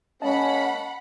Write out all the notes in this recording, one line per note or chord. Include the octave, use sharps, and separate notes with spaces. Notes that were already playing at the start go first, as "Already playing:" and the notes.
G#3 A#3 C#4 D#5 F5 F#5 A5 B5